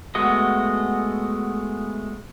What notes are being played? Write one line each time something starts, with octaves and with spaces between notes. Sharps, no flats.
G#3 A3 B3 F#4 D#5